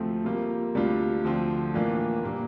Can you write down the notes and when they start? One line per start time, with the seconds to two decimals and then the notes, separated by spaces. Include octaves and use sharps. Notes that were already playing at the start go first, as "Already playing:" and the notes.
Already playing: D2 C3 F3 A3 C4
0.24 C3 G3 A#3 F4
0.75 D2 C3 G3 D4 F4
1.24 D2 D3 F3 C4 F4
1.74 A2 E3 A#3 D4 F4
2.24 A#2 G3 A#3